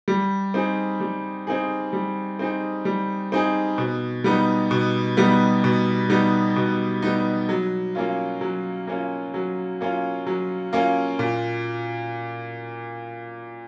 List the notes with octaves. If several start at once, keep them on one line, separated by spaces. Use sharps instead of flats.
G3
C4 D#4 G#4
G3
C4 D#4 G#4
G3
C4 D#4 G#4
G3
C4 D#4 G#4
B2
G3 B3 D#4
B2
G3 B3 D#4
B2
G3 B3 D#4
B2
G3 B3 D#4
F#3
A#3 C#4 F4
F#3
A#3 C#4 F4
F#3
A#3 C#4 F4
F#3
A#3 C#4 F4
A#2